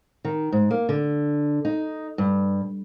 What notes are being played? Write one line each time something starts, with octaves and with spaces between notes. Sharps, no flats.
D#3
G#2
A#3
D3
D#4
G2